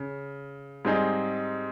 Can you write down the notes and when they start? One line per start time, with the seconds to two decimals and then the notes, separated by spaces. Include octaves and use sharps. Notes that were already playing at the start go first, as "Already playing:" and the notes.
Already playing: C#3
0.85 G#2 G3 C4 D#4 G#4